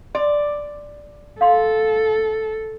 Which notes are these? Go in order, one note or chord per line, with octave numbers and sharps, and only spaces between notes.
D5 C6
A4 F5 C6